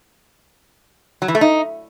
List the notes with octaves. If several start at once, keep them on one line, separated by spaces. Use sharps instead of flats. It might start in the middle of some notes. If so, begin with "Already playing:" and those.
F#3
E3
A3
D#4